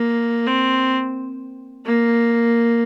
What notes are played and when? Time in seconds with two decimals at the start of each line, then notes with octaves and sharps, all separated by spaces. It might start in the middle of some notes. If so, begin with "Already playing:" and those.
Already playing: A#3
0.47 C4
1.86 A#3